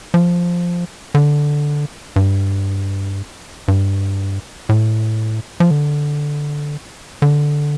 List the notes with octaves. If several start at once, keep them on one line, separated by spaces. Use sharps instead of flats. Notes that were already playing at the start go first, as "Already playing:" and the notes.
F3
D3
G2
G2
A2
F3
D3
D3